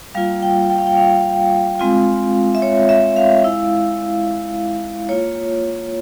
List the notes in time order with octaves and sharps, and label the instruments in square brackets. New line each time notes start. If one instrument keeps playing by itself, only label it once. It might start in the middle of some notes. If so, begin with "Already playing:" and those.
[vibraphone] G3 A#3 F4 F5
G5
G5
F5
G5
F5
G#3 C4 F4
E5
C#5
E5
F5
G#3 E4
A#3 F4 C#5